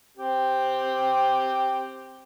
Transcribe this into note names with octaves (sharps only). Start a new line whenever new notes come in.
C4 G4